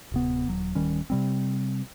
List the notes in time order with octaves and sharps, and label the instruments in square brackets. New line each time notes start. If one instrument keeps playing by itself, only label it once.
[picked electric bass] D1 C3 B3
D#1 F#3
D1 D#3 G3 C#4
C3 G3 C4